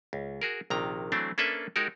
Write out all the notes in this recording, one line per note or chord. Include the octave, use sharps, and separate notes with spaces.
C#2
F#4 G#4 A#4
A#1 C3 D#3 A#5
E3 F#3 A3 C4 D4
A#3 C#4 D4 A4 B4 E5
G#3 D#4 F#4 G4 A#4